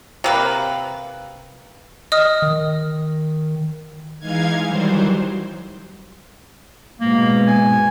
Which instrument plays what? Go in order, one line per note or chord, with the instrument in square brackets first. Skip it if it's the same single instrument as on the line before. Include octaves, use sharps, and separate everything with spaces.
[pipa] C3 A#3 B4
[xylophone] D#5 D#6 F6
[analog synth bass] D#3
[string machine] E3 G#3 D#4 F5 G#6
D#3 E3 F#3 G3 C5
[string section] G#2 B2 [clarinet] A#3
[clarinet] G#5